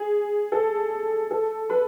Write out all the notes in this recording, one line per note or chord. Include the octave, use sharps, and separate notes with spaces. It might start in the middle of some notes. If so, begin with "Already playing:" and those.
Already playing: G#4
A4
A4
B4